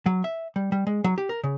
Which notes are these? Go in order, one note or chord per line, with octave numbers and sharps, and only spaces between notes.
F#3
E5
G3
G3
G#3
F#3
G4
A#4
C#3